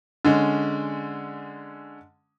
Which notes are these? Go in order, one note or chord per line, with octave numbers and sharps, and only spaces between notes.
D3 G#3 C#4